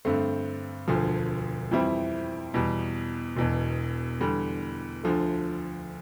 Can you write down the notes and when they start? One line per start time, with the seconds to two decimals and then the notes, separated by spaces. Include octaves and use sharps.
0.05 G2 D3 A3 C4
0.88 E1 D2 D3 F3
1.71 F2 E3 G3 C4 E4
2.54 E2 B2 G3
3.37 E1 E2 B2
4.21 E2 D3 G3
5.04 D2 D3 F3 A3